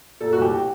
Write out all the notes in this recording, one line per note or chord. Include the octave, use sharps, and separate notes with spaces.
A#2 A4
F#4
C2 G4